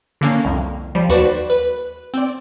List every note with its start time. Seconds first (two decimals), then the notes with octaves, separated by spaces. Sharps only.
0.21 D3 A#3 C#4
0.45 C2 F2
0.95 F3 G3
1.09 D#2 F#4 B4 C5 D5 E7
1.50 B4
2.14 C4 D5